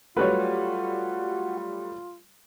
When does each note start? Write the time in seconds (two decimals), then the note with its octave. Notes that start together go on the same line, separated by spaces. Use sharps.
0.17 F#3 G3 A3 F4 F#4 B4 C#5